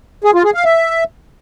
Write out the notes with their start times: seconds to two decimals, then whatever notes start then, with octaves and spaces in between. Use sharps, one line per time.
0.24 G#4
0.34 F4
0.44 G#4
0.54 F5
0.65 E5